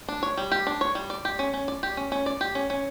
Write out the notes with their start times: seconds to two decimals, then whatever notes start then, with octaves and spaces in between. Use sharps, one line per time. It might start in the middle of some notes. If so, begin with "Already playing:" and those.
0.08 D4
0.23 C#5
0.37 G3
0.51 G4
0.67 D4
0.81 C#5
0.95 G3
1.10 D5
1.25 G4
1.39 C#4
1.54 C#4
1.68 D5
1.83 G4
1.97 C#4
2.12 C#4
2.26 D5
2.41 G4
2.55 C#4
2.70 C#4